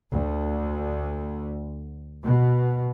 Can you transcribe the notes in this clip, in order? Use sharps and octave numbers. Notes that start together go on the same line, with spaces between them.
D2
B2